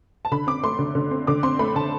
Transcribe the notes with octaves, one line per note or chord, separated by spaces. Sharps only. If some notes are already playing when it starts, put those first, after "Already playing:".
A5
D3 B5
C4 D6
A3 C6
D3
D3
C4
D3 D6
C4 C6
A3 B5
D3 A5